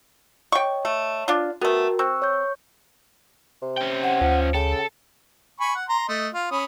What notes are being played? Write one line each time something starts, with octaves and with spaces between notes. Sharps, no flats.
C#5 D#5 G5 C#6
A3
D4 F4
A3 B3 F#4 A#4 G5
C4 C#6 E6 F#6
C#5 C#6 G6
C3
C#4 G5
F#5
D2 F3
C#3 A4 G5
G#5 B5 C#6
F#5
A#5 C6
A3 D#5
F4
C#4 B5 D#6